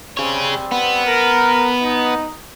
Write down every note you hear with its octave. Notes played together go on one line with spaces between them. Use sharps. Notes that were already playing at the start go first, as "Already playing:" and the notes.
G3 C4 G#4 C#5
B3
A#4
D#4